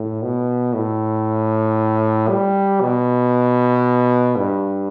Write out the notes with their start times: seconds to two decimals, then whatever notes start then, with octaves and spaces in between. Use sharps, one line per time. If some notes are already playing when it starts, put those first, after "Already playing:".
Already playing: A2
0.23 B2
0.74 A2
2.30 G3
2.81 B2
4.37 G2